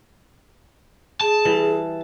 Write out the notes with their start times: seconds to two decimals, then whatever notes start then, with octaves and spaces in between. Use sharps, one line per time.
1.21 G#4 A5
1.45 E3 G3